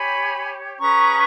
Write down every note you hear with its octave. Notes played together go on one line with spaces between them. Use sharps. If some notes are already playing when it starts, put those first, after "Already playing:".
Already playing: G4 C#5 G#5 B5
C#4 G#4 B4 A#5 C#6